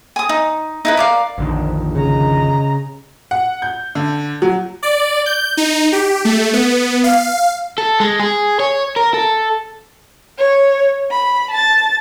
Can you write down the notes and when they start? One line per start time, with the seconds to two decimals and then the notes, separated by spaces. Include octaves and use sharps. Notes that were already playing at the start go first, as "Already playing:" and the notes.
0.16 G#5 D#6
0.29 D#4
0.85 D#4 E4 B4
0.97 A#4 D5 F5
1.38 A#1 F2 D3 D#3
1.95 C#3 D#5 A#5
3.31 F#5
3.62 G6
3.95 D3
4.42 F#3
4.83 D5
5.26 G6
5.57 D#4
5.92 G4
6.25 A3
6.53 B3
7.04 F5
7.78 A4
8.00 G#3
8.20 G#4
8.60 C#5
8.96 A#4
9.14 A4
10.39 C#5
11.11 B5
11.50 A5 A6